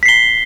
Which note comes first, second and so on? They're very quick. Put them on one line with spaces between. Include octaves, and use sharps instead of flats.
B6 C7 G7